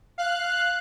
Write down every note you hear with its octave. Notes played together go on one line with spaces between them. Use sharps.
F5 F#6